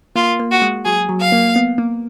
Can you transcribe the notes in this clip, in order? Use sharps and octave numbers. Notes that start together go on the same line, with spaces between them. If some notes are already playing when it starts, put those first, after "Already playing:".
A#3 F4
A#3
F#4
G#3
F#3 G#4
F#3
F5
A#3
B3
A#3